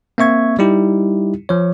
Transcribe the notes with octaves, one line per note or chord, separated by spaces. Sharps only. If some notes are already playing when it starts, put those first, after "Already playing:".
A#3 C4 E5 C#6 G#6
G3 D#4 E4 G4
F3 C#5